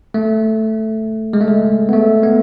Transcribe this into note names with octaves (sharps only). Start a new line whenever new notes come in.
A3
G#3
A3
G#3
B3
A3
B3